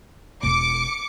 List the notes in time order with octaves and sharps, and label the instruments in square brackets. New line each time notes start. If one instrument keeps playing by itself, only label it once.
[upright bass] E1 F4 [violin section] D6 C#7